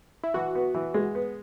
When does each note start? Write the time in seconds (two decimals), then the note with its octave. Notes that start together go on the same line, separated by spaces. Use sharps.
0.24 E4
0.34 E3 F#4
0.55 B3
0.74 E3
0.94 G#3
1.15 B3